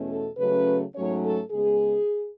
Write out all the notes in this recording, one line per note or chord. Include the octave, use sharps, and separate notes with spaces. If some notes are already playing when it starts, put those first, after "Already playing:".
Already playing: E2 B2 A3 C#4
A4
C#3 F#3 A3 C#4 B4
G#2 F#3 A3 C#4 C#5
A4
C#3 G#3 B3 G#4